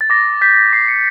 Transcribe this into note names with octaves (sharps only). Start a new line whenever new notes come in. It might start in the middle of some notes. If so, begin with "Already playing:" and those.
A6
D6 A#6
G6 B6
D6 C7
C#7